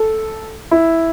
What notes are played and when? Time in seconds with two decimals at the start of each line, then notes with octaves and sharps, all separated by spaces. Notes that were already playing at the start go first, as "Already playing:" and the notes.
Already playing: A4
0.71 E4